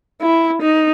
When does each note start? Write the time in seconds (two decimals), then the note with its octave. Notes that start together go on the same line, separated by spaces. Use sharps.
0.21 E4
0.62 D#4